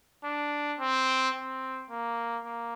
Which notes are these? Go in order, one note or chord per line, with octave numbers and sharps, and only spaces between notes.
D4
C4
C4
A#3
A#3